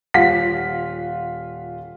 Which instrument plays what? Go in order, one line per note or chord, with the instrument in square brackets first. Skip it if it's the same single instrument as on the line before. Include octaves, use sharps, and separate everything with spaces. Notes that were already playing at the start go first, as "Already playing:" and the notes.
[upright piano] D#1 F4 F5 F#5 B6